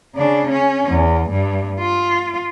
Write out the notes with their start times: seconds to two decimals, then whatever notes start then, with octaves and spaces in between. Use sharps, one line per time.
0.16 C#3 D4
0.51 C#4
0.88 E2
1.30 G2
1.80 F4